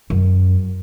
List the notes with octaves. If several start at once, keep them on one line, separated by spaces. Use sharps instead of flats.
F#2